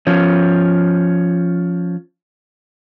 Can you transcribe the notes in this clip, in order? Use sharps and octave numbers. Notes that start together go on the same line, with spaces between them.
F3 C#4